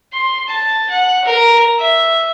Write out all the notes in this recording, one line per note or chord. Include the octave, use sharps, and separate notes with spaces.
C6
A5
F#5
A#4
E5